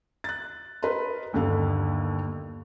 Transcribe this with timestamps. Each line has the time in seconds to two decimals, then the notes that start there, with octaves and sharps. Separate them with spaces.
0.24 F#6 A6
0.83 A#4 B4 D#5 A#5 C6
1.33 G1 D#2 D3 A4 F5